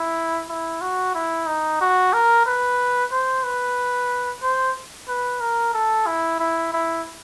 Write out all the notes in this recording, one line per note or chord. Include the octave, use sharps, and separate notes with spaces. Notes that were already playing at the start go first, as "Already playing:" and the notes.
Already playing: E4
E4
F#4
E4
D#4
F#4
A#4
B4
C5
B4
C5
B4
A#4
A4
E4
E4
E4